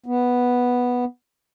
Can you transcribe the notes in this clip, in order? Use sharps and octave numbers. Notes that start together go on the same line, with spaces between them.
B3